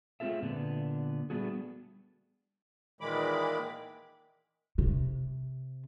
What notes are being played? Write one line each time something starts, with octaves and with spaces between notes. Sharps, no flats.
G#3 A3 C4 F4 A4 E5
A#2 D3 B3 D4
G3 A3 B3 D4 F#4 G#4
A#2 D#3 E3 G#3 B5 D6
C3